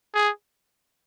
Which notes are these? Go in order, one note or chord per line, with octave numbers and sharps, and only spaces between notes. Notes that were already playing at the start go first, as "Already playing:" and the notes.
G#4